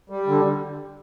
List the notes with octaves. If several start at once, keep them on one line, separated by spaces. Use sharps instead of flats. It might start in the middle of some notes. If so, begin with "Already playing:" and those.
G3
D3